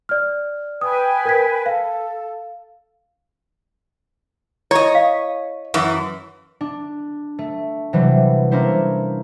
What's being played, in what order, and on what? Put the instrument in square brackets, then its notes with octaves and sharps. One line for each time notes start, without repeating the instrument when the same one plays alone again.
[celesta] D5 F6
[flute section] B4 G5 G#5 [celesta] D#6
[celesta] A#4 G#6 B6
[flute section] A4 [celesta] F5
[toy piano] E4 [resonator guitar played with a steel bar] C#5 D#5
[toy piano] F5
[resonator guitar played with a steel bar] F#2 E3
[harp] D4
A3
C3 E3 F#3 G3
A#3 C#4 D4 E4 C5